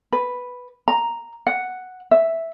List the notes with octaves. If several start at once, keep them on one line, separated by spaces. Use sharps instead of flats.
B4
A#5
F#5
E5